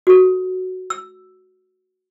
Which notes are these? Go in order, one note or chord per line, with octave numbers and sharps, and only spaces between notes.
F#4 A4
E6